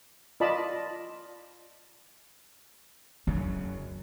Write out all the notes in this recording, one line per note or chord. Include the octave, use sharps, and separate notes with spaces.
F4 D5 D#5 A5 B5
F#2 C#3 F#3 E4